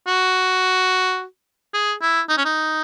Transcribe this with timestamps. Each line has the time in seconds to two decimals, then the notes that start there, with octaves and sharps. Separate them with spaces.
0.07 F#4
1.74 G#4
2.02 E4
2.29 D#4
2.38 C#4
2.45 D#4